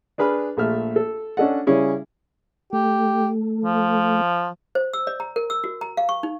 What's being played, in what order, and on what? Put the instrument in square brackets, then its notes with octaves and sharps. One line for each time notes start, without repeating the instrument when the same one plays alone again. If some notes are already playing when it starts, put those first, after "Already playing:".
[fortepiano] D4 G#4 B4 B5 F6
A#1 A3 E5 F6
A4
C#4 D4 A4 D#5 F#5
C#3 G3 C#4 E4 G#4
[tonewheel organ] A3 [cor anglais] G4
[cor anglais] F3
[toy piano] C5
E6
D5
A#5
A#4
E6
F#4
A#5
F5
C#6
D#4